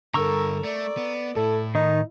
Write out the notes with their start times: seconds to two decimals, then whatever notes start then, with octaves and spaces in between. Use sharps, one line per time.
0.14 G2 D3 A4 A#4 A#5 C#6 E6
0.64 A3 D5
0.97 B3
1.36 A2 E4 A4
1.75 D#3 D#4